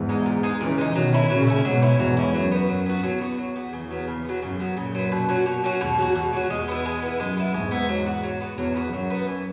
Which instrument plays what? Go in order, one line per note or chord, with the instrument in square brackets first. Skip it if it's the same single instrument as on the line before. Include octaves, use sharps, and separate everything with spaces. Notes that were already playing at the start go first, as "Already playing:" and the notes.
Already playing: [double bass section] E2 G#2
[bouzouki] G#3 D#4
A#2
G#3 D#4
[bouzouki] A#2 [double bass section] C#3 E3
[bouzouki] G#3 D#4
[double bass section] B2 D#3 [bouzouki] F#3
[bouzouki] C#4 E4
[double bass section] A#2 C#3 [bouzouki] F#3
[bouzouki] C#4 E4
[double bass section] G#2 B2 [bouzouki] F#3
[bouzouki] C#4 E4
[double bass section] E2 G#2 [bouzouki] F#3
[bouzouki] C#4 E4
[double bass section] F#2 [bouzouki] F#3
[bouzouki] B3 F#4
[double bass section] F#2 [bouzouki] F#3
[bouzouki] B3 F#4
[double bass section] E2 [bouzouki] F#3
[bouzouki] B3 F#4
F#3
B3 F#4
[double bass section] E2 [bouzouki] C#3
[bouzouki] F#3 B3
C#3
F#3 B3
[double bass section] F#2 [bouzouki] C#3
[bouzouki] F#3 B3
[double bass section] F#2 A#2 [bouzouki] C#3
[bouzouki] F#3 B3
B2
F#3 C#4 F#4
B2
F#3 C#4 F#4
[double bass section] E2 G#2 [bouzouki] B2
[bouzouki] F#3 C#4 F#4
[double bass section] E2 [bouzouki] B2
[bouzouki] F#3 C#4 F#4
[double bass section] E2 [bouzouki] G#3
[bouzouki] B3 E4
G#3
B3 E4
[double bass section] F#2 [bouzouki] G#3
[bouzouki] B3 E4
[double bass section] E2 G#2 [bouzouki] G#3
[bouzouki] B3 E4
F#3
B3 F#4
F#3
B3 F#4
[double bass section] E2 [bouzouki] F#3
[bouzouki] B3 F#4
[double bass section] F#2 [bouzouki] F#3
[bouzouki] B3 F#4
E3